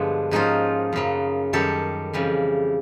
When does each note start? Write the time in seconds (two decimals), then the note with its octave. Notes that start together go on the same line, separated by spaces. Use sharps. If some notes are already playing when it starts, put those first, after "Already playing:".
Already playing: G2 D3 F3 G#3 B3
0.31 G#2 F3 A#3 C#4 D#4 F4
0.93 F#2 C#3 F#3
1.53 F#2 D#3 G3 G4 A4
2.13 F2 C#3 E3 G3